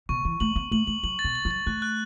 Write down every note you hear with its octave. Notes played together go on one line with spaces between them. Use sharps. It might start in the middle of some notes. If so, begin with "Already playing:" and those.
B2 C#6
E3 C#6
A3 F#7
B3 F#7
A3 F#7
A3 F#7
F#3 F#7
A6
B2
F#7
F#3
A6
A3 F#6
F#6